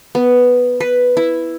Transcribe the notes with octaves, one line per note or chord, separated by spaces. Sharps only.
B3
B4
E4